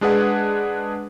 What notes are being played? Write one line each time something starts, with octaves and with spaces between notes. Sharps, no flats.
G#3 D4 G#4 B4 F#5